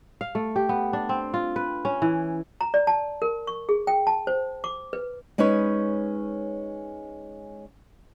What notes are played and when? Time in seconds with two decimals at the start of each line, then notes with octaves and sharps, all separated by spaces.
0.21 F5
0.35 A3
0.56 G4
0.69 B3
0.93 D4
1.09 C4
1.34 F4
1.56 B4
1.85 C#4
2.02 E3
2.61 A#5
2.74 D5
2.87 A5
3.22 A#4
3.47 C#6
3.69 G#4
3.87 G5
4.07 A5
4.27 C5
4.64 D6
4.93 B4
5.38 G#3 C#4 D#4 B4 C#5